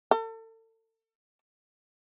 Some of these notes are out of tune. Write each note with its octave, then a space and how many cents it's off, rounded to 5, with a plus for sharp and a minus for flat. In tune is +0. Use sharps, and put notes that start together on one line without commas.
A4 +35